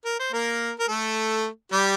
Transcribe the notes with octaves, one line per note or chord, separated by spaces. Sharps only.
A#4
C5
A#3 A#4
A#4
A3 A4
G3 G4